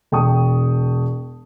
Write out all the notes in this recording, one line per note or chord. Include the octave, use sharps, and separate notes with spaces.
E1 G5 A5 C#6 D#6